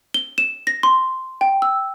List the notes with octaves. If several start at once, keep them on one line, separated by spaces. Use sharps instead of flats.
G7
E7
A#6
C6
G5
E6